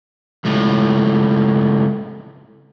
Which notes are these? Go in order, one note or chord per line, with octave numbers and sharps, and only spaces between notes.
C#2 A2